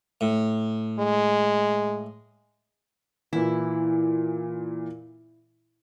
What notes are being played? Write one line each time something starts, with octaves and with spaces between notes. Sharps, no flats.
A2
G#3
A#2 E3 E4